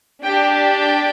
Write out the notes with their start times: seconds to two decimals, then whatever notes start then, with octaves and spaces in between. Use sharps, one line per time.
0.23 D4 G4 G5
0.77 G5